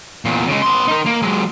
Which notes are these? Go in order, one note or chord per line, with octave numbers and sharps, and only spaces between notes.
E2 A#2
C#3 G#3
B3 C6
D#4 A#4
A#3
F#3 G#3